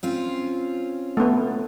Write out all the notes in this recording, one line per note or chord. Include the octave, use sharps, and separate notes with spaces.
C4 C#4 F4
A3 B3